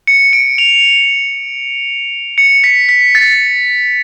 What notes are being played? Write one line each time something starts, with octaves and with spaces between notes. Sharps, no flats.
C#7
D7
F7
C#7
B6
B6
A6